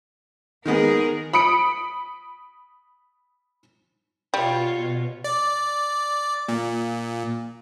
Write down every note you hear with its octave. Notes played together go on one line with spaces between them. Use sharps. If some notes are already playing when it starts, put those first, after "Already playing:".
D#3 G#3 B3 G#4 A#4
B5 D#6 C#7 D7
B2 G3 F4 C#5
D5
A#2